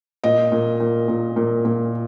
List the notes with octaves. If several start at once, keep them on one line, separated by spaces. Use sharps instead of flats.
A#2 D#5
A#2
A#2
A#2
A#2
A#2